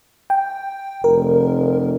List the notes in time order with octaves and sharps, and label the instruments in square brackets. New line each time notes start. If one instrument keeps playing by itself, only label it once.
[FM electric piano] G5
[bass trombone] F1 [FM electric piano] A#4